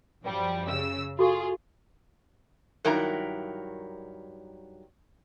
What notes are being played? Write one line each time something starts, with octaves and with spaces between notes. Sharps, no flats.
F#2 F3 G3
C#3 E6
F4 F#4 G#4 A4 C#6
G2 D#3 F#3 E4 A#4 A#5